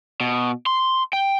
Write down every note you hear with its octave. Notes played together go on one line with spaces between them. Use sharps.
B2
C6
G5